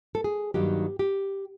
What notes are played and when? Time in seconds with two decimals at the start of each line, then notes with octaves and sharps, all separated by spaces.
0.15 A4
0.24 G#4
0.54 G2 D#3 F#3 A#3 D#4 G4
0.99 G4